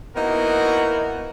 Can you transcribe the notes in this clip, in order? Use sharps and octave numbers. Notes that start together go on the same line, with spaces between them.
A#3 B3 D#4 E4 F#4 A#4